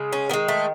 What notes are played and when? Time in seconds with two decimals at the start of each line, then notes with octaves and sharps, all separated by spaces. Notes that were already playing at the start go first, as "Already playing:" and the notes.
Already playing: C#3 G#3
0.13 C#4
0.30 D#3 B3
0.33 G#3
0.48 A3